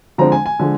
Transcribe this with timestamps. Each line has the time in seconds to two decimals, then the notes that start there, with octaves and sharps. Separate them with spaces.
0.18 D3 F3 G#3 C4 A#5
0.32 G#5
0.46 G#5
0.60 D3 F3 G#3